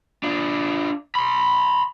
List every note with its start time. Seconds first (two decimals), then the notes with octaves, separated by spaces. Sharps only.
0.23 D4 F4
1.15 B5 C6